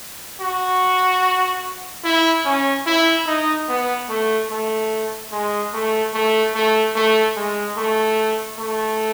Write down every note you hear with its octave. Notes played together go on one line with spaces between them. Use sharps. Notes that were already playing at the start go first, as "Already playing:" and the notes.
F#4
E4
C#4
E4
D#4
B3
A3
A3
G#3
A3
A3
A3
A3
G#3
A3
A3